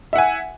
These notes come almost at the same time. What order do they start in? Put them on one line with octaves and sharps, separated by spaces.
E5 F#5 G#5